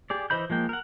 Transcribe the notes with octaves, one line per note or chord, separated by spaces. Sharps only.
G4 G#4 D5
E3 C5 D#5 B5 G6
F3 G#3 A#3 G5
A#4 F#5